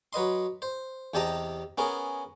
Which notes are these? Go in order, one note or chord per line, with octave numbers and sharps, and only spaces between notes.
F#3 B4 D#5 C6
C5
E2 C3 G4 D#5 A5 A#5
B3 C#4 G#4 A#4